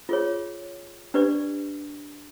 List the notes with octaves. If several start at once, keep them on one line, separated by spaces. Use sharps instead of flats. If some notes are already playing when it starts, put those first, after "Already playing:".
F4 G#4 C#5
D4 G4 B4 D5